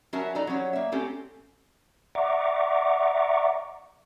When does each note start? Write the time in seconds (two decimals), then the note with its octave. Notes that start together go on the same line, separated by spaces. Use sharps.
0.13 F#3 C#4 F#4 A#4 E5 A5
0.35 E3 D#4 A4 D5 A#5
0.47 F#3 G3 C#4 C#5
0.73 A#3 E5
0.92 A3 C4 C#4 G4 A4
2.15 D5 E5 F#5 A#5 C#6 D6